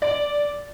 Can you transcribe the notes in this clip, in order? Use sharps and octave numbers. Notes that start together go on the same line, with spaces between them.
D5